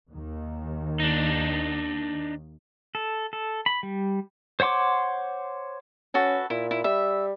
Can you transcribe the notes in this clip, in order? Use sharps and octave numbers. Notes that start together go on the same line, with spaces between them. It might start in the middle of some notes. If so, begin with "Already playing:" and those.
D#2 D#3
D4 D#4
A4
A4
B5
G3
C5 C#5 F#5 C6 D6
C#4 F#4 A4 B4
A#2 E4
E4
G3 E5